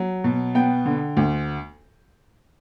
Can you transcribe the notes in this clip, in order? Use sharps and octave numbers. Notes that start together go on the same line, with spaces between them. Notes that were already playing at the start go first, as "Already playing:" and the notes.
Already playing: F#3
B2
B3 G5
D3
D2